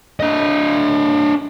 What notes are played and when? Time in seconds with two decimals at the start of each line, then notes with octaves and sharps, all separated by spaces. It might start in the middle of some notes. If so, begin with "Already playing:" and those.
0.20 D4 D#5